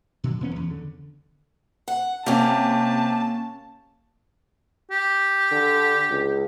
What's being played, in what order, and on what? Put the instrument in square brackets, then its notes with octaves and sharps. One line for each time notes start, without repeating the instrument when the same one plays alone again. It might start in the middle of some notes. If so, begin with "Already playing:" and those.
[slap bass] B2 D3 F3 F#3
E1 G2 B3 C#4
E2
D3
[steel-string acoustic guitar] F#5
[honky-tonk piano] C3 [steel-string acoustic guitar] A#3 C#4 [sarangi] A5
[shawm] G4
[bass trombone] D3
C#2